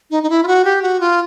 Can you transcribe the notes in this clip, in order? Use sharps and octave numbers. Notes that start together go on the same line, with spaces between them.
D#4
D#4
E4
F4
F#4
G4
F#4
F4